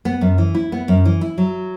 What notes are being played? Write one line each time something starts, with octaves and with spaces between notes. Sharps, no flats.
B3
F#2
E3
E4
B3
F#2
E3
E4
F#3